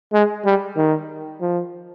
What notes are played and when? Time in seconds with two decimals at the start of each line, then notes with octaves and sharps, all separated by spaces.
0.13 G#3
0.45 G3
0.77 D#3
1.41 F3